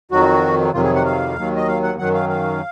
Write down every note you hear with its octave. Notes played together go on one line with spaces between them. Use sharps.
F2 D#3 F#3 F#4
F2 C3 D#3 F#3 F4
G#4
F#5
F5
D#2 D#3 F#3
D#5
F5
F#5
F#2 D#3 F#3 F#5
F5
F5